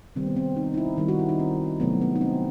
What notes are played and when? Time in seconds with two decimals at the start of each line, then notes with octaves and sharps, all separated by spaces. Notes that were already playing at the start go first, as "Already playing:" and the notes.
0.16 C3 D#3 G3 C4
0.26 B3
0.37 C4
0.56 D#4
0.74 D#4
0.77 E4
0.97 D#3 G3 D#4
1.08 F#4
1.19 E4
1.29 D#4
1.39 C4
1.80 C3 F#3 A3 B3
2.01 B3
2.16 D#4
2.21 C4